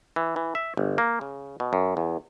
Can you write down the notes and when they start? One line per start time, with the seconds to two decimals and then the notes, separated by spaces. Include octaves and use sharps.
0.16 E3
0.36 E3
0.55 E5
0.77 G1
0.98 A#3
1.21 C#3
1.60 B2
1.73 F#2
1.97 E2